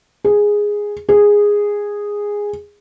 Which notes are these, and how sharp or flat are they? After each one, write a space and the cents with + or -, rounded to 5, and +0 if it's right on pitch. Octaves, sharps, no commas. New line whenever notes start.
G#4 -5
G#4 -10